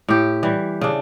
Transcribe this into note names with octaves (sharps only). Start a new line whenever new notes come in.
A2 G4
E3 G3
C#3 D4